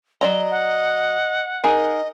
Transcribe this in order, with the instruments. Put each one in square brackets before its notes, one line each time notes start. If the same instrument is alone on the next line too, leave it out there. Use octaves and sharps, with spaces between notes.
[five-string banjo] F#3 D5 A#5 [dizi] D#5 [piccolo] G7
[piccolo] F#5
[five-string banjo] D#4 G#4 A#4 [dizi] D#5